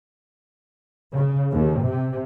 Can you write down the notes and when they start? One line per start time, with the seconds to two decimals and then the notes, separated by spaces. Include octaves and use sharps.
1.14 C#3
1.52 D#2
1.83 C3